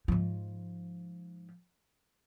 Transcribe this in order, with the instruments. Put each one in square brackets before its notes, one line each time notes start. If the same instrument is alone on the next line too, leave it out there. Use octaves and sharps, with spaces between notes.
[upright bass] G#2 F3